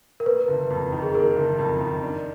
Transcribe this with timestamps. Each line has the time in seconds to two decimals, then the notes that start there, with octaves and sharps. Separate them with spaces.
0.20 A#4
0.26 A#3 B4
0.48 F#1
0.70 F2
0.92 D#3
1.03 G#4
1.14 A#3 A#4
1.36 F#1
1.59 F2
1.81 D#3
2.03 D4